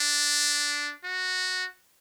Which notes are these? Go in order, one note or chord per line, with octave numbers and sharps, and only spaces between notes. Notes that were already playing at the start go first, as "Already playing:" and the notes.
Already playing: D4
F#4